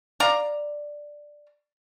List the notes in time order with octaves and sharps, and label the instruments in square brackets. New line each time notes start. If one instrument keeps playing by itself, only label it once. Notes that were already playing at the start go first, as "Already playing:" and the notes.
[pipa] D5 F5 A#5